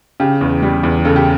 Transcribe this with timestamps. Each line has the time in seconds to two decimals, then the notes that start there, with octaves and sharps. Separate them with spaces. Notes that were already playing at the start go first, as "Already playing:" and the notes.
0.20 C#3 G4
0.41 E2
0.62 G3
0.83 E2
1.05 C#3 A4
1.16 G4